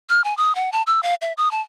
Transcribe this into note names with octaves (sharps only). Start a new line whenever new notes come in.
F6
G#5
D#6
F#5
A5
E6
F5
E5
D#6
A5